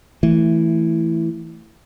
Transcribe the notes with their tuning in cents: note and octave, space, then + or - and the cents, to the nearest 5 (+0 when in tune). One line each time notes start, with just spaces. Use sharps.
E3 +0 A3 +10